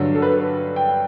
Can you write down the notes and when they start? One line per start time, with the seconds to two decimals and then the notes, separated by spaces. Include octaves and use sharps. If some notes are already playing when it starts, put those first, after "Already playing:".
Already playing: G2 D3 F#3
0.15 A4
0.22 B4
0.76 G5